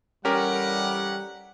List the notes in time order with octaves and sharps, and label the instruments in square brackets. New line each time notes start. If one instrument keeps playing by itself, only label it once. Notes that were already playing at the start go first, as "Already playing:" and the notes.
[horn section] E3 A4 F#5 [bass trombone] G3 [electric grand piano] C#4 G4 A#4